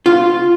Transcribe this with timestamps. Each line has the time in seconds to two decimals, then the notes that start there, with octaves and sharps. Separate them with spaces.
0.06 F4